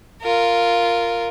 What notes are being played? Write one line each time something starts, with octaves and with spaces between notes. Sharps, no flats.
F4 A#4